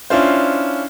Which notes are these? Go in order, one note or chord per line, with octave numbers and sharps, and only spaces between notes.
C#4 D4 E4 F4 C5